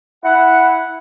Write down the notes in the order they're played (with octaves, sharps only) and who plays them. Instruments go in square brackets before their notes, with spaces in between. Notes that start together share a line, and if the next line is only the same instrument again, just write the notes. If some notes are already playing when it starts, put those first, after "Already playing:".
[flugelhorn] E4 [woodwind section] F#5